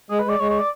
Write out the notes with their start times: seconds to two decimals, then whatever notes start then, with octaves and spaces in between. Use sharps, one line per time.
0.10 G#3 G#4
0.19 B4
0.25 G#3 D5
0.39 G#3 C#5
0.50 C#5
0.59 D5